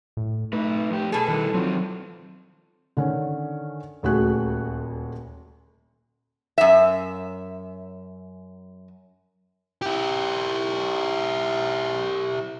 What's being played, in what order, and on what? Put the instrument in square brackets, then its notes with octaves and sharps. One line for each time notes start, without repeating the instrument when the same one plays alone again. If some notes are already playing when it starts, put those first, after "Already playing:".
[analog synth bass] A2
[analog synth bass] A3 [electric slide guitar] D#4 B4
[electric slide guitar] F2 G4
[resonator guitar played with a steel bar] B2 A4 [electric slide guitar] G#4
[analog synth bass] D#3 [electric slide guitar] G3 E4 B4
[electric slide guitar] D#3 F3 C4 [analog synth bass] F#3
[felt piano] D3 D#3 C#4
D#1 D2 F#4 G#4 F#6
[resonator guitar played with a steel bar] F#2 E5
[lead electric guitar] E4 G4